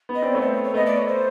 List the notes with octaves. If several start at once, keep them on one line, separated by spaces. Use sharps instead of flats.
B3
D#5
C4 D5
A3 B3 C#5
C5
C#5
C#5
A3 B3 D#5
D5
C#5
C5